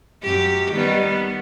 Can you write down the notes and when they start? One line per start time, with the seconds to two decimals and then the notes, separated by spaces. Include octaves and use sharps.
0.23 F#2 G4
0.73 D#3 G3 B3
1.06 B3